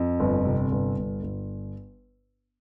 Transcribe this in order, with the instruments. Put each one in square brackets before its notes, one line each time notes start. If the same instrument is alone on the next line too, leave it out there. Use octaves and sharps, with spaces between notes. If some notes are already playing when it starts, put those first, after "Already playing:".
Already playing: [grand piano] F2
G1
C3
G1
G1
G1